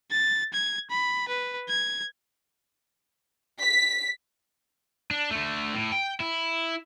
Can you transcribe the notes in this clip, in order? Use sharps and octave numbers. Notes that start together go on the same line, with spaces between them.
A6
G#6
B5
B4
G#6
B6
D4
D3 A3
A2
G5
E4